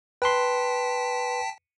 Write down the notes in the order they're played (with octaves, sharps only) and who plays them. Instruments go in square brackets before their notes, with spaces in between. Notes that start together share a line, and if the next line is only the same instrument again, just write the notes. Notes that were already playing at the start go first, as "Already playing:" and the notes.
[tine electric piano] B4 C6 [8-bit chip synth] G5 A5 B6